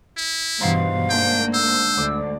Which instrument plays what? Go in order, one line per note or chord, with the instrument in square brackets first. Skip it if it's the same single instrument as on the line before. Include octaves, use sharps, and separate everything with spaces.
[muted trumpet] E4
[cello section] G2 B2 E3 [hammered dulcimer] D#4 C5 F#5 [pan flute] F5
[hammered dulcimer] G#2 D3 A3 [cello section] A#3 [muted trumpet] G5
[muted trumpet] C5 [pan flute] E6
[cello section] D2 [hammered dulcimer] D5